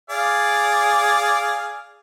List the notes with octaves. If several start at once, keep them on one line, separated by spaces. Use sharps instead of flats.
G#4 D5 F5